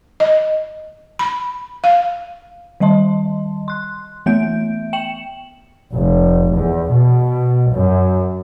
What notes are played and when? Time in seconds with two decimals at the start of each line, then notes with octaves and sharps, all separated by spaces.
0.20 D#5
1.19 B5
1.84 F5
2.80 D#3 G3 D#5 A5 C6
3.68 C6 F#6
4.26 E3 A3 B3 E5 G6 D7
4.93 G5 C#7 E7 F#7
5.93 F1
6.52 E2
6.90 B2
7.73 F#2